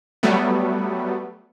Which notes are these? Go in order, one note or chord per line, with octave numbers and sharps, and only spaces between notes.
F#3 G3 A3 B3